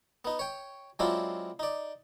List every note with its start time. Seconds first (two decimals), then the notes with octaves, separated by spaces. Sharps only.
0.25 B3 D#4
0.39 C#5 G5
0.99 F#3 G#3 C4 D4 E4 F4
1.59 D#4 D5